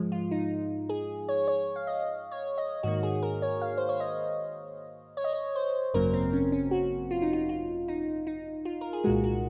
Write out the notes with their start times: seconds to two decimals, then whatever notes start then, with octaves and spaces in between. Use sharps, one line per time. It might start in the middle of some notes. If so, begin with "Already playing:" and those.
Already playing: G#2 F3 G#3
0.12 F4
0.31 D#4
0.89 G#4
1.29 C#5
1.48 C#5
1.76 F5
1.87 D#5
2.31 C#5
2.58 D#5
2.83 G#2 D#3 A#3 F#4
3.03 G#4
3.23 A#4
3.42 C#5
3.62 F5
3.77 C5
3.89 C#5
4.00 D#5
5.17 C#5
5.24 D#5
5.33 C#5
5.56 C5
5.94 G#1 F#2 C#3 F#3 A#3 A#4
6.14 C4
6.33 C#4
6.52 C#4
6.71 F#4
7.11 F4
7.22 D#4
7.33 F4
7.49 F4
7.88 D#4
8.27 D#4
8.65 F4
8.81 A#4
8.93 G#4
9.04 C2 A#2 G#3 F#4
9.24 F#4